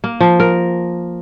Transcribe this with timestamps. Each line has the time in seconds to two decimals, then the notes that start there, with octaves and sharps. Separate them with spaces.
0.04 A#3
0.21 F3
0.40 A#4